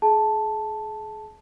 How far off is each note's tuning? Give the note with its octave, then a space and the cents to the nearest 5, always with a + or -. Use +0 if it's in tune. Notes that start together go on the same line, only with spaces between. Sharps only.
G#4 +30 A5 +0